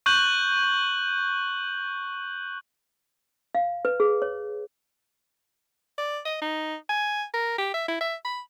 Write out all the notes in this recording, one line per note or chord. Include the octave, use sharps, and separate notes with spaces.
C#6 F#6 G6 F#7
F5
B4
G#4
C#5
D5
D#5
D#4
G#5
A#4
G4
E5
E4
E5
B5